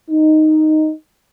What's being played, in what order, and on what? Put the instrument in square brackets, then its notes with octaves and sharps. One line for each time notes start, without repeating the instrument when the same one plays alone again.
[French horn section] D#4